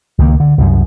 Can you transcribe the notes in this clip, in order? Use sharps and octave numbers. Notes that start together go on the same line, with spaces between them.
C#2 D#3 F3 A#3
D3
C2 F#2